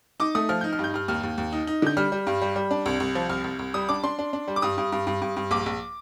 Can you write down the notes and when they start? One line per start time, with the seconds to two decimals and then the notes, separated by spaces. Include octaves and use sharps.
0.20 D#4 D6
0.35 A3 D#6
0.49 F3 F6
0.61 D#4 G6
0.73 F6
0.79 G2
0.84 G6
0.94 G2 F6
1.08 D#2 F6
1.23 D#2
1.38 D#2
1.53 D#4
1.67 D#4
1.82 D3 G6
1.97 G3 F6
2.12 G3
2.27 G2
2.42 G3
2.56 G3
2.71 D4
2.86 C2
3.00 C2
3.15 F3
3.29 C2 F6
3.44 C2
3.59 C2
3.74 G3 D#6
3.89 D4 D6
4.04 D4 C6
4.19 D4
4.33 D4
4.48 G3
4.56 D6
4.62 G2 D#6
4.78 G2
4.92 G2
5.07 G2
5.22 G2
5.37 G2
5.51 A#1 D6
5.66 A#1